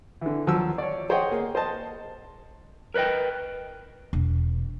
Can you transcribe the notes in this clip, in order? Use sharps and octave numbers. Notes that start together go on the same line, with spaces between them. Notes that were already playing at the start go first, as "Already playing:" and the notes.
D3 E3
D#2 F3 F#3 E6
C#5 D5
G#4 C5 C#5 D#5 F#5 G5
A#3 G#4
C5 D#5 A5
A#4 B4 C#5 D#5 G5
E1